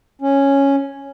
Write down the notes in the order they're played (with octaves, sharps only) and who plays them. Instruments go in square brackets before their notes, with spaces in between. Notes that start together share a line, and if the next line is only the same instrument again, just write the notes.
[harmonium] C#4